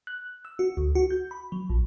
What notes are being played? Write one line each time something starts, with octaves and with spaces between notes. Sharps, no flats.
F#6
E6
F#4
D2
F#4
G6
B5
F#3
A#1